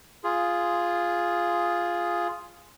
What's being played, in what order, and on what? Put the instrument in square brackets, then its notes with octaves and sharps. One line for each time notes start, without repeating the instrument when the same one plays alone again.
[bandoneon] F4 G#4